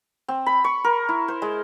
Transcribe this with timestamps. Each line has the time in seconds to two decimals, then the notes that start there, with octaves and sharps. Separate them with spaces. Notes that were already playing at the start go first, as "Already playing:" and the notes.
0.28 C4
0.46 B5
0.64 C#6
0.84 A#4
1.09 E4
1.28 C5
1.42 G#3